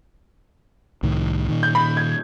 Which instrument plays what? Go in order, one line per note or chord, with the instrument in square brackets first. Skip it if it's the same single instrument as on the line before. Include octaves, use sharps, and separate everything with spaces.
[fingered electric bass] C2 A2 D#3
A#2 D#3
[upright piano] G6
B5
G#6